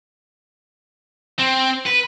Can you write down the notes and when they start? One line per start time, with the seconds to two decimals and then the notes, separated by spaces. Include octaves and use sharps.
1.39 C4
1.86 B4